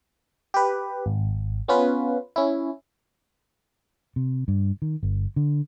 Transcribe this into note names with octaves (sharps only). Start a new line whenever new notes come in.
G4 B4
G#1
B3 C#4 F4 B4
C#4 E4
C3
G2
D#3
G1
D3